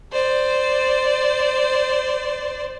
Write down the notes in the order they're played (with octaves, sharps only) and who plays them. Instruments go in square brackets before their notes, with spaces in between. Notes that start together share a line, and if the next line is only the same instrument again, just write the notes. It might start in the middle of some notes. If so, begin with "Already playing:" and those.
[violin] C5 D5